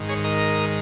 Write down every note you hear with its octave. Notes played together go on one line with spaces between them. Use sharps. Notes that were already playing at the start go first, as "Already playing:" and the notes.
Already playing: G#2 D#3
G#4 C#5
A#4 D#5